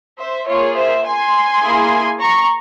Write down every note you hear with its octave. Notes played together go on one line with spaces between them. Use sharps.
C5 E5
A#3 F4 G#4 C#5
C5 E5
G#5 C6
A#3 E4 G#4
A#5 C#6